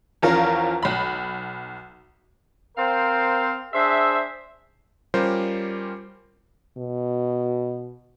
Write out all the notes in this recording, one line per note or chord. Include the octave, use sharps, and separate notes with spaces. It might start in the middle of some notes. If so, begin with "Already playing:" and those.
E2 F3 C#4 A#4 F5
B1 B5
C4 A#4 C5 F5
D4 G#4 C5 E5
G3 C#4 F4 G4 A#4 C5
B2